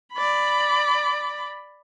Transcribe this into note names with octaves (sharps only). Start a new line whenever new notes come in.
D5 B5